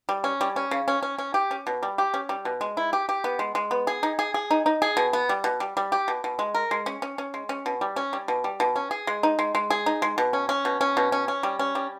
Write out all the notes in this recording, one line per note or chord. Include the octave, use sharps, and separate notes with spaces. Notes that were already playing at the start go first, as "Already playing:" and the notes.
G3
C#4
G3
C#4
C#3
C#4
C#4
C#4
G4
C#4
B2
G3
G4
C#4
G3
B2
G#3
E4
G4
G4
B3
G#3
G#3
B3
G#4
D#4
G#4
G#4
D#4
D#4
G#4
B2
B3
G3
B2
G3
G3
G4
B2
B2
G#3
A#4
G#3
C#4
C#4
C#4
G#3
C#4
B2
G3
C#4
G3
B2
G3
B2
C#4
G#4
G#3
D#4
G#3
G#3
G#4
D#4
G#3
B2
C#4
C#4
B2
C#4
B2
C#4
C#4
G3
C#4
G3